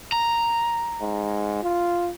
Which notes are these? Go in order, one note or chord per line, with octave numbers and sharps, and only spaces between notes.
A#5
G#2
F4